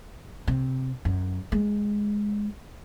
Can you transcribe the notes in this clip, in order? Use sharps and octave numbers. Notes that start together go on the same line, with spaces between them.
C3
F#2
G#3